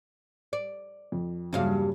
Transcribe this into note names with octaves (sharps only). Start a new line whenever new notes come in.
D5
F2
E2 G2 C#3 F#3 A#3 F5